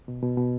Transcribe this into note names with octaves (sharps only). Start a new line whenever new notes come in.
B2
B2
B2